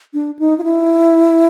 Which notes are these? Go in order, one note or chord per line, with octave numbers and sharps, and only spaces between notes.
D4
D#4
F4
E4